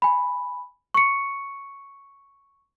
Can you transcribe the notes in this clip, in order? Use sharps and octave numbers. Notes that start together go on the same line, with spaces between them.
G#5 B5
C#6 C#7